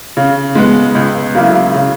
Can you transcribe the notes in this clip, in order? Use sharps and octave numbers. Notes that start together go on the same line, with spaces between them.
C#3
G#3 B3
C#2
C#3 F#3 A#3 E4
C#3